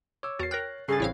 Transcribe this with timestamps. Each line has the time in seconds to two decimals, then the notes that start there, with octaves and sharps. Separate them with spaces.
0.23 C#5 D6 E6
0.39 E2 F#4 A#4 A6 C7
0.51 A#4 G5 F6 F#6 A#6
0.88 G2 C#3 G#4 A4 A6 C7
1.00 A1 C4 E4 C#5 F5